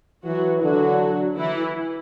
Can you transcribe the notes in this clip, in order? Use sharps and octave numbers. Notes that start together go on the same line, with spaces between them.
E3 F#3 F#4
D3 F#3 F#4
E3 E4